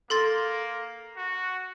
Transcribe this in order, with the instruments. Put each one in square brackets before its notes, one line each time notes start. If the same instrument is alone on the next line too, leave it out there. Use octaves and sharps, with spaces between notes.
[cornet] A#3 [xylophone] A4 C6 A6
[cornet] F#4